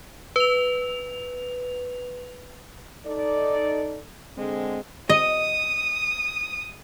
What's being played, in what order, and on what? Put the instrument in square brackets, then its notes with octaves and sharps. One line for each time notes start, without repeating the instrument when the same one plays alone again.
[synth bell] B4 F7
[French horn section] D#4 A4 D5
D3 G#3 C4
[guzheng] D#5 [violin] D#6